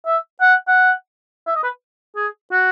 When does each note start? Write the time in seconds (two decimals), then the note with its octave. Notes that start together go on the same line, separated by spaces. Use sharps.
0.06 E5
0.41 F#5
0.67 F#5
1.46 E5
1.55 D#5
1.63 B4
2.16 G#4
2.51 F#4